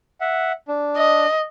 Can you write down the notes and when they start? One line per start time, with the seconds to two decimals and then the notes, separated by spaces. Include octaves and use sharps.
0.21 E5 F#5
0.68 D4
0.96 D#5